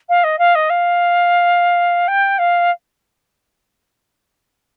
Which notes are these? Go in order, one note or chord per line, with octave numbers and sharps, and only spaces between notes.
F5
D#5
F5
D#5
F5
G5
F5